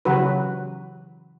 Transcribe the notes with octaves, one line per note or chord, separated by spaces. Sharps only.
C#3 E3 F#3 F#4 G4 B4